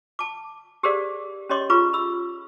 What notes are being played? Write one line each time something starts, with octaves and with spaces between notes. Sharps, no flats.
A5 D6
G4 G#4 A#4 C5 D5 F5
C#4 G4 C#5 D#5 C6 D6
F4 G#4 B4 A#5 C#6 D6
B5 E6